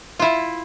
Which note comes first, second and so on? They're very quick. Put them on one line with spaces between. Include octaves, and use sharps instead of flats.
F4 E4 E5